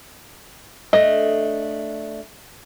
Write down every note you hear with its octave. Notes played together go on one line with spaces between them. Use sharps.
A3 D4 D#5